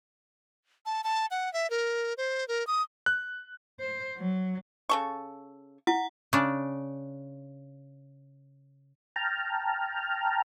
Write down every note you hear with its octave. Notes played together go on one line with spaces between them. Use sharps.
A5
A5
F#5
E5
A#4
C5
A#4
D#6
F#6
C5
F#3
C#3 A4 C#6
E4 F#5
C#3 D4
G5 A5 A#5 F6